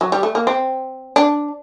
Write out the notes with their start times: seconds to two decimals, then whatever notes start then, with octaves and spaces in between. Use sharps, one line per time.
0.01 F#3
0.12 G3
0.23 A3
0.35 A#3
0.47 C4
1.16 D4